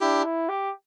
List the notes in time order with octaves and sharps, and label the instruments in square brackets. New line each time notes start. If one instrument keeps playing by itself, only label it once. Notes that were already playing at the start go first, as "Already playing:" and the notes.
[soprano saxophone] D4 [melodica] E4 G4
[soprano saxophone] E4
G4